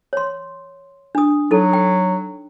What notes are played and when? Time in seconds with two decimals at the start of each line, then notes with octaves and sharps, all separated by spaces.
0.13 C#5 C6
1.15 D4 D#6
1.51 F#3 D#4 A4
1.73 G5